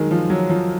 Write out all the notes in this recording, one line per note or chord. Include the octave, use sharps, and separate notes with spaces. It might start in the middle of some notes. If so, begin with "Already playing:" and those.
Already playing: D#3 F#3 G#3
F3
F#3
F3